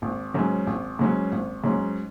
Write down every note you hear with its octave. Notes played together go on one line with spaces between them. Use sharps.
G#1
G#2 F#3 C#4
G#1
G#2 F#3 C#4
G#1
G#2 F#3 C#4